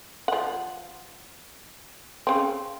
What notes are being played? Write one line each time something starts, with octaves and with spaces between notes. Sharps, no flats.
F3 F#5
C#3 C4